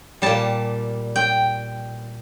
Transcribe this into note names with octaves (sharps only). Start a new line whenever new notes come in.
A#2 G3 A5
G5